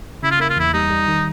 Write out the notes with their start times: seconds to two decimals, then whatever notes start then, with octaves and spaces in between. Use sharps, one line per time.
0.22 C#3 E4
0.31 F4
0.40 A#3 E4
0.50 F4
0.56 E2 E4
0.73 G3 D#4
0.90 G3
1.08 D#3